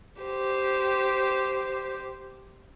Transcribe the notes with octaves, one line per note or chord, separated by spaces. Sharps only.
G4 C5